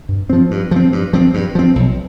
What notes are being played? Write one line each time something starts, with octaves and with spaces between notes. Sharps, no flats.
G2
F3 C4
G2
F3 C4
G2
F3 C4
G2
F3 C4
B1